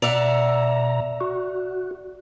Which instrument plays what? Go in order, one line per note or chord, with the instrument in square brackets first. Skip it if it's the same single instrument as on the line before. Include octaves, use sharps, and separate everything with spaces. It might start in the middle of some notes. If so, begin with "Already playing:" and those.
[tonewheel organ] B2 A#5 [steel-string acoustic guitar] D5 E5 F#5
[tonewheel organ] F#4